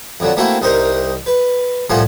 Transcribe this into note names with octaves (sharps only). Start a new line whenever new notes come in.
F2 D3 F#3
A3 A#3 C4 E4 F#4
C2 D#4 A#4 C5 A#5
B4
C2 A2 F3 F#5 G#5 C6